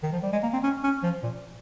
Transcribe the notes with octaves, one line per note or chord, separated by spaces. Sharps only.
D#3
F3
G3
G#3
A#3
C4
C#4
C#4
F3
A#2